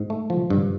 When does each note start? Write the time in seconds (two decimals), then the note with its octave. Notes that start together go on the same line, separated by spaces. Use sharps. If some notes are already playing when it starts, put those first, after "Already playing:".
Already playing: G#2
0.10 A3
0.30 F3
0.50 G2